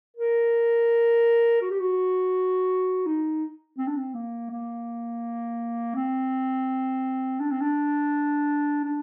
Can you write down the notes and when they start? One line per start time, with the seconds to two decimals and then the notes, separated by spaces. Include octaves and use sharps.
0.16 A#4
1.62 F#4
1.70 G4
1.80 F#4
3.06 D#4
3.78 C4
3.87 D4
3.97 C4
4.14 A#3
4.51 A#3
5.95 C4
7.40 D4
7.51 C4
7.61 D4
8.84 D4